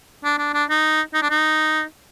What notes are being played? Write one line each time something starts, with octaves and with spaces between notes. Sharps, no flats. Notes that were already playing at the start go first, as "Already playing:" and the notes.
D4
D4
D4
D#4
D#4
D4
D#4